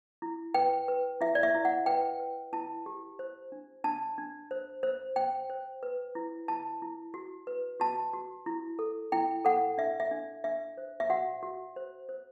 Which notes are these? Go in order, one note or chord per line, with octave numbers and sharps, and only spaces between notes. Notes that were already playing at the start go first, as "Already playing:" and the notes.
E4
B4 G5
B4
E4 E5
D5
E5
E4
F#5
B4 G5
B4
E4 A5
G4
C5
D4
D4 A5
D4
C5
C5
C5 G5
C5
B4
E4
E4 A5
E4
F#4
B4
F#4 A5
F#4
E4
A4
E4 G5
A4 F#5
D4 E5
E5
D4
D4 E5
C5
E5
F#4 F#5
F#4
C5
C5